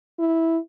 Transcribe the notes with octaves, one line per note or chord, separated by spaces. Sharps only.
E4